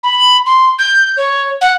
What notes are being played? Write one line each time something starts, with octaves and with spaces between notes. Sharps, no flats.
B5
C6
G6
C#5
F#5